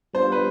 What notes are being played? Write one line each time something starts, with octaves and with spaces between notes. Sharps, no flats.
G3 B3 D4 F4 C5
B4